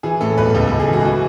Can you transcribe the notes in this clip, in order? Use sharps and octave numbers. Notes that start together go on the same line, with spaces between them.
E3 G#4
A2 A4
B1 B4
C#2 A4
C#2 A4
G#4
E3
F#4
G#4
E3 F#4